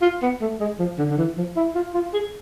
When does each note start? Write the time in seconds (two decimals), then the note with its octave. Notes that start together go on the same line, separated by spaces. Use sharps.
0.02 F4
0.22 B3
0.41 A3
0.60 G#3
0.79 F3
0.98 D3
1.10 D3
1.18 E3
1.37 F3
1.56 E4
1.75 F4
1.94 F4
2.13 G#4